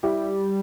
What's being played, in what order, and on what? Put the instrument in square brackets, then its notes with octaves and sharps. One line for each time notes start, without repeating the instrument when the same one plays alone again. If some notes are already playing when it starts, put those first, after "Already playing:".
[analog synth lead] G3 [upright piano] E4 G4